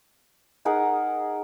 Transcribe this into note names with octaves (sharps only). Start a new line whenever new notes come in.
D#4 G#4 A#4 F#5